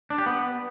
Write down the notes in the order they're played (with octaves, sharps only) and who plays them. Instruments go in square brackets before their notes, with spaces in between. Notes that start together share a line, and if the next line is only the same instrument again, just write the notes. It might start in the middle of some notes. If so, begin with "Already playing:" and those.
[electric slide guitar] D4
G4
B3